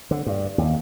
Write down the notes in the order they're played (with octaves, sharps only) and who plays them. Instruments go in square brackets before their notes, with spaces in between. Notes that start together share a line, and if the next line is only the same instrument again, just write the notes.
[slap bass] D3
G2
D#2